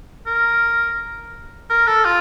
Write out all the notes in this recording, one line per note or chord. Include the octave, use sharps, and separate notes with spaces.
A#4
A#4
A4
F4